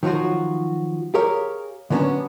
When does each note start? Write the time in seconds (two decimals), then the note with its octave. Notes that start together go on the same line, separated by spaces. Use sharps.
0.03 D#3 F3 F#3 F4 F#4
1.14 G4 G#4 A#4 C#5 F5
1.90 D3 F#3 G#3 B3 C#4 D4